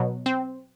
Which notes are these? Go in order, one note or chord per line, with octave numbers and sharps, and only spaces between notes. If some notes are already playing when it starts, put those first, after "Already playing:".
Already playing: B2 F#3
C4